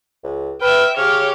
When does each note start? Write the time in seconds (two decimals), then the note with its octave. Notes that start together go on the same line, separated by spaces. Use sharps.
0.24 C#2
0.61 B4 E5 G5 F6
0.97 C#3 G4 C#5 F6